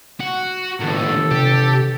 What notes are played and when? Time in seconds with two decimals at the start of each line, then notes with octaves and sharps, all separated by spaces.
0.20 F#4
0.81 G1 D#2 A2 A4
1.31 C3 G4